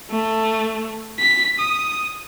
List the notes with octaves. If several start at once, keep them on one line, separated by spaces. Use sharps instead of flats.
A3
B6
D#6